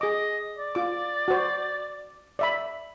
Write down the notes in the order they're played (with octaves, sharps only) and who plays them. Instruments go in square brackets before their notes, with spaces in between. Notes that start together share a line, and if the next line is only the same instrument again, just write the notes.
[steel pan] G#4 D6 [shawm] D#5
[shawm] D5
[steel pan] F4 D6
F#4 C5
D5 E5 B5